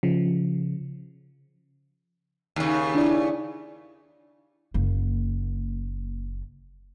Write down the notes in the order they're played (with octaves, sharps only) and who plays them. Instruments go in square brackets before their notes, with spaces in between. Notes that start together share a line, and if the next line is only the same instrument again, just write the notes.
[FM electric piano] C#3 F3
[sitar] D#2 C#3
[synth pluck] D4 E4 D5
[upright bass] F#1 A#3